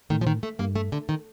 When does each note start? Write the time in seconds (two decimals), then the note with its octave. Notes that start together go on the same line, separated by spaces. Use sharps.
0.10 A2 D#3
0.21 A#2 F3
0.27 D#3
0.30 A2
0.43 A3
0.59 G2 A#3
0.76 A3
0.92 D3
1.09 D#3